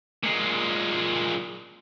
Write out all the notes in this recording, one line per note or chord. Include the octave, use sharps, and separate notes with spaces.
A#2 G#3